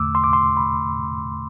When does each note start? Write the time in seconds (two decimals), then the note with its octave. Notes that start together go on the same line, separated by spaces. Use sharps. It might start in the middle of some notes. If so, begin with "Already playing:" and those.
Already playing: E2 D3 A3 D6 E6
0.15 C6
0.24 D6
0.33 C6
0.57 B5